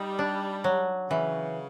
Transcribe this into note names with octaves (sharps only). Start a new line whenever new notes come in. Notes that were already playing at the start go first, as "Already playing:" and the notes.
Already playing: G3 D#4
D4
F#3
C#3 E3